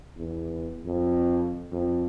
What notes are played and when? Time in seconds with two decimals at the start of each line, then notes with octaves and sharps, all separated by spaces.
0.18 E2
0.86 F2
1.72 F2